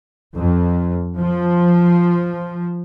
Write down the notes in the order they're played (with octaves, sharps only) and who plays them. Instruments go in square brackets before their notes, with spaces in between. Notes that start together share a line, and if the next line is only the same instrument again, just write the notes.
[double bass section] F2
F3